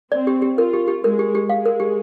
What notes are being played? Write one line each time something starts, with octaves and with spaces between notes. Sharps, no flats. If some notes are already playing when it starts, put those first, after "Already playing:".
C4 D5
G4
G4
F4 A#4
G4
G4
G#3 A#4
G4
G4
G#3 F5
A#4
G4